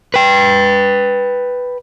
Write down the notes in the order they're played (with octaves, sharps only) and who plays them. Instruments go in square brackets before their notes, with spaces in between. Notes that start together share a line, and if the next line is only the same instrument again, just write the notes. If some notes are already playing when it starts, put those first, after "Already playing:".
[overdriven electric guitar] B4 G5